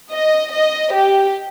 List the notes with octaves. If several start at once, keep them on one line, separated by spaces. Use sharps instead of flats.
D#5
D#5
G4